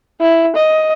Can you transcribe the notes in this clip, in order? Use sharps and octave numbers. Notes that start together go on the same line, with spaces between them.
E4
D#5